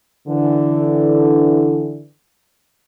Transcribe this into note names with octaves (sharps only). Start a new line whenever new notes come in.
D3 E3